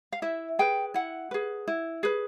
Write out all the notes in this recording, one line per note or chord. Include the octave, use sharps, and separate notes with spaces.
F5
E4 E5
G#4 B4 G5
E4 F#5
G#4 B4
E4
G#4 B4